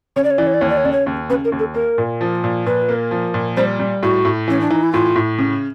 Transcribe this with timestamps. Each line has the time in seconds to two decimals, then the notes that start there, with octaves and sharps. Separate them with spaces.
0.16 C#3 C#5
0.24 D5
0.31 C#5
0.38 E3 D5
0.47 C#5
0.54 D5
0.61 D#2 C#5
0.70 D5
0.77 C#5
0.84 C#3 D5
0.92 C#5
1.06 D#2
1.29 C#3 B4
1.45 A#4
1.52 D#2
1.59 A4
1.74 A#3 A#4
1.98 A#2
2.21 F3
2.44 A#2
2.66 A#2 B4
2.89 A#3
3.11 F3
3.34 A#2
3.57 G3 C5
3.80 G3
4.03 A2 F#4
4.25 A2
4.48 E3 C#4
4.61 D4
4.70 E3 D#4
4.83 E4
4.93 A2 F4
5.16 A2
5.38 C#3